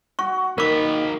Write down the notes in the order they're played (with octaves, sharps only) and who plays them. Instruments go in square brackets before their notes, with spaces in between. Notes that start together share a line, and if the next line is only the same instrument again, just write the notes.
[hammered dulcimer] F#4 [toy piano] C#6
[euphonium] D#3 [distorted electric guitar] A#3 B5 [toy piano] A#4 D6